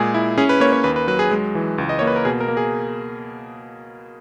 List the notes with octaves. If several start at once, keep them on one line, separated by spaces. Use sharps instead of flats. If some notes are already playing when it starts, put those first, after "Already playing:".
Already playing: A#2 G#3 G#4
E4
C#4 G#4
B4
A#3 C#5
C#5
D#2 B4
B4
F#3 B4
G#4
G#3
E3
C#2
D#5
A#3 C#5
B4
A#4
B2 G#4
A#4
A#3
G#4